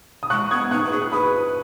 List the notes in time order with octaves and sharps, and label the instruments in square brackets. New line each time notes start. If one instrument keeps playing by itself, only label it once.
[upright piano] D#6
[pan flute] G#3 [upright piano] C#6 F#6
[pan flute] B3 [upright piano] D#6 G#6
[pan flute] D#4 [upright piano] C#6 F#6
[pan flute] B4
[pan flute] G#4 [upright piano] D#6
[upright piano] F#6
[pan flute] B4 [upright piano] B5 D#6